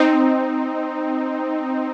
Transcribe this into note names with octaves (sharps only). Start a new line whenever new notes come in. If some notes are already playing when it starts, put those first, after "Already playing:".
Already playing: C4 D#4